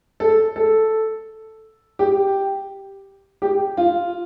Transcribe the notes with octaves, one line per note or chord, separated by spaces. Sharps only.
A4
A4
G4
G4
F4